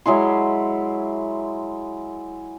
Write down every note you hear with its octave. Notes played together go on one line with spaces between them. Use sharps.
F#3 G#3 E4 C6